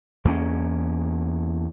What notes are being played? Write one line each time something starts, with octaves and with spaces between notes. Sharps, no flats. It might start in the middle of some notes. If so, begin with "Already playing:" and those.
E2 A#3 C4 C#4